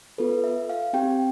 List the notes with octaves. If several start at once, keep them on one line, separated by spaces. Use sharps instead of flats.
B3 F4 A4 B4
E5
F5
C4 G4 G5